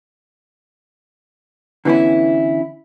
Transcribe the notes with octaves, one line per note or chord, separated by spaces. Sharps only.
D3 E3 B3 C#4 E4